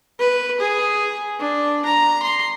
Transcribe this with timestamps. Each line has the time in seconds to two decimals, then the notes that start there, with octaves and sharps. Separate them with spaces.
0.19 B4
0.61 G#4
1.40 D4
1.85 A#5
2.23 C6